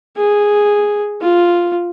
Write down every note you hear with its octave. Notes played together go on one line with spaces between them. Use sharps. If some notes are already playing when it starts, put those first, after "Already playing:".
G#4
F4